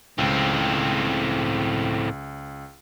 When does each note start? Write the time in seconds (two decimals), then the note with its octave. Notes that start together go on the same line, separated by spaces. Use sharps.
0.19 C#2 A2 C4